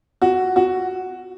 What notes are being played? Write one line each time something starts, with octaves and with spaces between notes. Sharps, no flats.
F#4
F#4